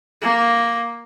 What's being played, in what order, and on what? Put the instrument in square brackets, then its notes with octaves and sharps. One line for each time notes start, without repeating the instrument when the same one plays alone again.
[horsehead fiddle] A#3